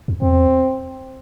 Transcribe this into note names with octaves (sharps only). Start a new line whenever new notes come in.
E2
E2 C4